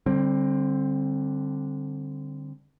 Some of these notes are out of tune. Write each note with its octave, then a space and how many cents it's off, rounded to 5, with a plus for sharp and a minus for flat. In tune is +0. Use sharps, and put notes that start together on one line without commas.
D3 +0 G3 +0 C4 +20